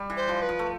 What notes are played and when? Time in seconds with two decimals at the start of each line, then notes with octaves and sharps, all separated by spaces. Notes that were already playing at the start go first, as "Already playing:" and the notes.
Already playing: G3
0.10 E3
0.17 C5
0.29 F3
0.42 B4
0.49 F3
0.59 A3